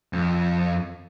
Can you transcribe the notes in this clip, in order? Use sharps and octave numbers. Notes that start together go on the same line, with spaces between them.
F2